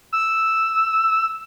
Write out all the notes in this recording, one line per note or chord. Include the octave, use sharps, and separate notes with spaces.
E6